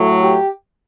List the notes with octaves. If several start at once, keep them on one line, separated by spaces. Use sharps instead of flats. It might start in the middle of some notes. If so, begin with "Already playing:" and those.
Already playing: A2 F#3 A3
G4